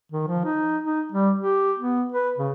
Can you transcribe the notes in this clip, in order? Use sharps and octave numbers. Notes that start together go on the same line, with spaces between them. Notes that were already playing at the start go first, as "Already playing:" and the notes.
D#3
F3
D#4
D#4
G3
G4
B3
B4
C#3